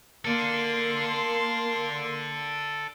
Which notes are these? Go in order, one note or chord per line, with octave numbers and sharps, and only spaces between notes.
A#3 A4 D5 C6